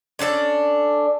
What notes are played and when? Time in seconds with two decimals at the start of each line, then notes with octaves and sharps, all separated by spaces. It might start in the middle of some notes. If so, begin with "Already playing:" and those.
0.19 C#4 D4 A4 D5